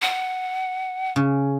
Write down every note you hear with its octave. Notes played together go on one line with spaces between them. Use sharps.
F#5
C#3